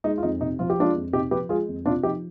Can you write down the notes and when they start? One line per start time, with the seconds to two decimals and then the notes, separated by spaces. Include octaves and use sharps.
0.04 G#3 D#4
0.18 F4
0.23 F2 D#4
0.40 C3 D#4
0.59 F3 F4
0.70 G4
0.78 G#3 D4 F4
0.96 F2
1.13 C3 D#4 G4
1.31 F3 G4 B4
1.49 G#3 F4 G#4
1.68 F2
1.86 C3 D4 F4
2.03 F3 D#4 G4